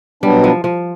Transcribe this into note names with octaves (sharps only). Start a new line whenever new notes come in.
B2 F#3 G3 B3 D4
F3
F3